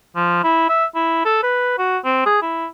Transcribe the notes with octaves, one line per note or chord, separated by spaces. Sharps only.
F3
E4
E5
E4
A4
B4
F#4
C4
G#4
E4